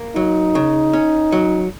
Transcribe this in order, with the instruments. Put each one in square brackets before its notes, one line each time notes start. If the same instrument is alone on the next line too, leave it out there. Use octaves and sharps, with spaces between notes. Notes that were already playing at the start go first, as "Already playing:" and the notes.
Already playing: [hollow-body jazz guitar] A#3
[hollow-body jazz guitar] F#3 [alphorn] D#4
[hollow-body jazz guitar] C#3
C#4
F#3